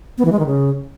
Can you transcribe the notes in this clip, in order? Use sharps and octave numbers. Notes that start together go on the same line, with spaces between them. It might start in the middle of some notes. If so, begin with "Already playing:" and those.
B3
E3
G#3
D#3
C#3